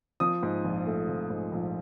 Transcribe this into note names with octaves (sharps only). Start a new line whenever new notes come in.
F3 D#6
G#2
A#1
A3
F3
G#2
A#1